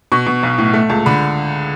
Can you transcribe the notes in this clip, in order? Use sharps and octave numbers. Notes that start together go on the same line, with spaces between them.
B2 C#6
B2
B1
A2
A3
C#2 A5
D3 B5